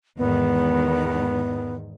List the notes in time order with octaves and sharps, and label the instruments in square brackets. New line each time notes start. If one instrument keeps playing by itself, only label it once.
[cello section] E2 G#2 D#3 [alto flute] B3